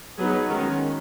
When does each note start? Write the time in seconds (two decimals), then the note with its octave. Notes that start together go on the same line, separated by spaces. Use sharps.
0.18 F#3 B3 D#4 G#4 B4
0.48 D#3 G#3 C#4 F#4 A#4